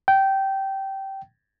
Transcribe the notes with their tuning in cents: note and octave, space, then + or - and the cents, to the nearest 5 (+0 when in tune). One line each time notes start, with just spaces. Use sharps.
G5 -15